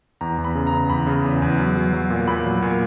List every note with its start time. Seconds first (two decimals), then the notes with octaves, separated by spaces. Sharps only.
0.21 E2 A#5
0.38 E2
0.44 B5
0.55 C#3
0.67 A#5
0.73 C#3
0.90 E2 B5
1.07 C#3
1.24 E2
1.42 E2
1.59 F#3
1.76 F#3
1.93 F#3
2.10 A#2
2.28 A#2 B5
2.46 F#3
2.62 A#2